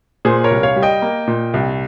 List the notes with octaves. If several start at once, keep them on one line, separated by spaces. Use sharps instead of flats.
A#2 G#4 C5
A#4 C#5
C2
C#5 F5
G3
D#5 G5
A#3
A#2
C2